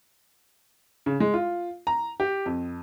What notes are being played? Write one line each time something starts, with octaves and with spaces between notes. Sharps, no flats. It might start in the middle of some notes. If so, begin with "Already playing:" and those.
C#3
G#3
F4
A#5
G4
F2